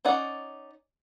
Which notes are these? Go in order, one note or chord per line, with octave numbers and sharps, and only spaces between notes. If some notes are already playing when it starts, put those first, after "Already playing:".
C#4 D#4 D5 F#5